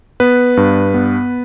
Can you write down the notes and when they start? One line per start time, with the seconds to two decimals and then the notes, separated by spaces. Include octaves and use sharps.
0.20 B3 B4
0.57 G2
0.94 B3